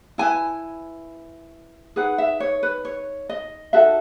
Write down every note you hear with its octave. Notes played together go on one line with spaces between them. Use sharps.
E4 B4 G#5
D#4 G#4 B4 F#5
E5
C#5
B4
C#5
D#5
D#4 F#4 A4 E5